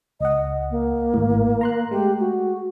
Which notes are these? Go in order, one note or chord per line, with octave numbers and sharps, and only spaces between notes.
C#2 D#5 F#5
A#3
G#1 A2
A#5 C6 F#6
G#3 A3 G4
F#4